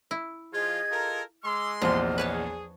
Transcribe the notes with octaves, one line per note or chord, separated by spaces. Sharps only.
E4
F3 F4 G#4 D#5 G#6
F4 A4 A#4
G#3 C6 D6 E6 F6
A#1 E2 C3 F3 D#5 F6
G#4 B4 C#5 A5